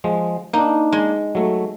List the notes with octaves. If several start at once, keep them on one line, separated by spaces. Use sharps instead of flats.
F3 G#3
A#3 D4 D#4
G#3
F#3 A3